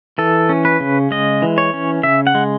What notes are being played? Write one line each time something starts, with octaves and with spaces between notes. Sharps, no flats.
E3 A4
C#4
B4
C#3
G#3 D#5
E3
C#5
C#4
C#3 E5
F#5
G#3